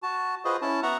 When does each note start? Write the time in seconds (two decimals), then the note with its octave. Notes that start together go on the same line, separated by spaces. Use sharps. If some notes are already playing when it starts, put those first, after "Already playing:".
0.03 F#4 A5
0.45 F4 F#4 G#4 B4 C5 D#5
0.62 C#4 E4 A5
0.83 B3 F#4 E5 F#5 A#5